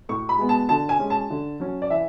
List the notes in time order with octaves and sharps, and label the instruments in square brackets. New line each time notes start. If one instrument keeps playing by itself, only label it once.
[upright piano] A2 C#6
B5
G#3 B3
A5
D3 A5
G#5
G#3 C#4
A5
D3
F#3 C#4
D5
E3 E5